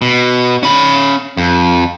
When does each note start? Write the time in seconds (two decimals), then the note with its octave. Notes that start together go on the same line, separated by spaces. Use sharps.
0.02 B2
0.63 C#4 B5
1.37 F2